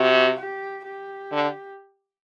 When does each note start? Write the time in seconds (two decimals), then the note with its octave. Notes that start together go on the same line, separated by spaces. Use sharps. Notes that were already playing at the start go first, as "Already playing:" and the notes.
Already playing: C3 F#4
0.37 G4
0.84 G4
1.32 D3